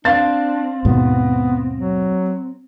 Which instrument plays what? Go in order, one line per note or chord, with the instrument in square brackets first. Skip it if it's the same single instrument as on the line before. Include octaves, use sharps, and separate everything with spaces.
[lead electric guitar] C4 [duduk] D4 [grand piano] F5 A6
[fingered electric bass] D#2 G#2 B2 [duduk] B3
[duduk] F#3